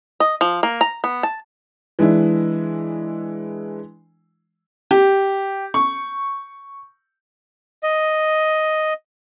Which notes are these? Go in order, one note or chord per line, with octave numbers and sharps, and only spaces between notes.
D#5
F3
A#3
A#5
B3
A5
E3 G#3 D4 E4
G4
C#6
D#5